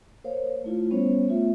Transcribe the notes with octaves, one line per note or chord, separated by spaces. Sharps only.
A#3 A#4 C5 C#5 F5
A3 E4 F4
G3 B3 C#4 C5 C#5
A3 B3 F4 E5